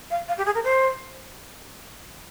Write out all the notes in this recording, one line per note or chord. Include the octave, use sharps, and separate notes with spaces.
F5
F5
G4
G#4
A#4
C5